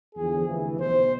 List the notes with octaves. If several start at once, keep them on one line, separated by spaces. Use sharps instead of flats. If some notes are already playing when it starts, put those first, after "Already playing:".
E2 D3 F3 G#4
D2 C3 E3
B1 B2 C5